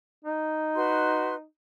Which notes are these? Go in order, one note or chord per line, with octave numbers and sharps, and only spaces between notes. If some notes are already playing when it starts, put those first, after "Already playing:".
D#4
F#4 B4 C6